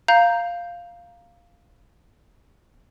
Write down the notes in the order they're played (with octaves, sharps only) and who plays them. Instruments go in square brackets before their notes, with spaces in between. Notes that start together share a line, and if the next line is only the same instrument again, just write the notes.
[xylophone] F5 A#5 G6